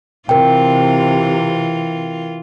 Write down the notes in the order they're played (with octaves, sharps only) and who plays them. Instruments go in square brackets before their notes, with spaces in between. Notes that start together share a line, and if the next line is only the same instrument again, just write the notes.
[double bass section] C3 [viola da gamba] E3 F4 [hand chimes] A#4 G5